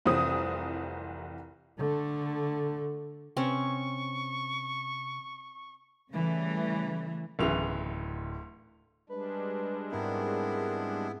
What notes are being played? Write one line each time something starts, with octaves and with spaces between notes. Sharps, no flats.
F1 C2 E3 C4 D#6
D3 A3
C3 C4 C#4 C#6
C#3 E3 G3 A3
D1 B1 C#3 E3 F7
G3 G#3 D4 B4
G#2 B3 C4 E4 A#4